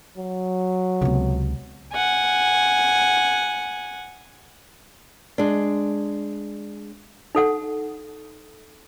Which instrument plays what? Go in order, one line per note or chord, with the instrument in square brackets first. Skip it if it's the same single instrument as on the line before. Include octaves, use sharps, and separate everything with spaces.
[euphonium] F#3
[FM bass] C#2 [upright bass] C3 B3
[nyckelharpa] F#5 G#5
[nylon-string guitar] G#3 D4
[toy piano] D#4 A4 F#5